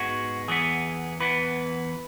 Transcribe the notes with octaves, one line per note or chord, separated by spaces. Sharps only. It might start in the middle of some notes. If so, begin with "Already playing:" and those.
Already playing: G#2 G#3 B3 F#4
E2 E3 B3 G#4
E2 E3 B3 B4